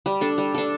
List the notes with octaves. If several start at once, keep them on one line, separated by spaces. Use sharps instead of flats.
G3
D4 A4
G3
D4 A4